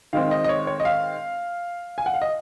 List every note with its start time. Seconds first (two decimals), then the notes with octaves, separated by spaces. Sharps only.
0.13 D#3 G#3 C4 F5
0.31 D#5
0.44 D#5
0.49 C#5
0.67 C#5
0.80 D#5
0.85 F5
1.98 G#5
2.06 F#5
2.14 F5
2.22 D#5